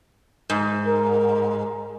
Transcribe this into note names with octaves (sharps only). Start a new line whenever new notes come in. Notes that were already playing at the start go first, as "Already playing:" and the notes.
G#2
A#4